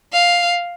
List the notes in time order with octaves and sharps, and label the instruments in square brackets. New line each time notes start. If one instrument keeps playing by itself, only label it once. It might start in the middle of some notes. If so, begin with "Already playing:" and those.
[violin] F5